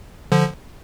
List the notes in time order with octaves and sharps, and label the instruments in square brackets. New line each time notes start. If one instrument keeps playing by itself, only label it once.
[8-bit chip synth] D3 F3